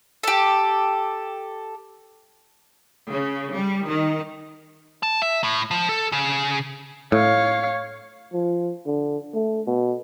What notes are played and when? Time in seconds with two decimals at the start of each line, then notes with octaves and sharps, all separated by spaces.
0.23 G4 A4
3.10 C#3
3.56 G3
3.87 D#3
5.03 A5
5.22 E5
5.43 A2
5.71 F3
5.89 A4
6.12 C#3
7.12 A2 C#5 F5
8.33 F3
8.86 D3
9.34 A3
9.67 B2